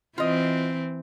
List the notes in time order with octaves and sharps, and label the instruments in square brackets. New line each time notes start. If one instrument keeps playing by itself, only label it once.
[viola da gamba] E3 C4 [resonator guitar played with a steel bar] F4 D#5